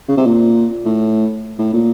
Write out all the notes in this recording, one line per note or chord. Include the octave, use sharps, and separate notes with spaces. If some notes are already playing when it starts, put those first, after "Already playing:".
C#3
C3
A#2
A2
A2
A#2